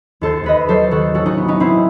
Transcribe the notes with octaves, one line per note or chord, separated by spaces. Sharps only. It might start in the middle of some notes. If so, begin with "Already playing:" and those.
D#2 A4 C5
D#2 B4 D#5
F#3 A4 C5
D#3 F#4 A4
A1 F#4 A4
D#4 F#4
B3
B3 D#4
E3 C4 E4